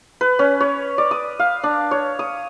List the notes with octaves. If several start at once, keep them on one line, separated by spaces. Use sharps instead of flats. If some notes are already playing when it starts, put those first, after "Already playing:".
B4
C#4
C#5
D5
D#6
F5
D4
C#5
D#6